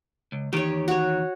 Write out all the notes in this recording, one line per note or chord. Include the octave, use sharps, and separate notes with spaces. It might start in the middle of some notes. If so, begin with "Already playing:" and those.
C#2
E2 D#3 G4 C#5
F#4 C#5